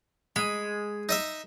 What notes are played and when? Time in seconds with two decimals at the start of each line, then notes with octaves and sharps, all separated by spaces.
0.36 G#3 B5
1.09 D#4 D#5 E5